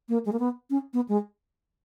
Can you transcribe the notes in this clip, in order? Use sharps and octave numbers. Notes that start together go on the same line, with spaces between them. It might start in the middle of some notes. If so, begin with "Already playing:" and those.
A#3
G#3
A#3
B3
C#4
B3
G#3